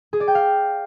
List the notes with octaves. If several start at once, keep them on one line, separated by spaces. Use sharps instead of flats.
G#4
D5
G5
F5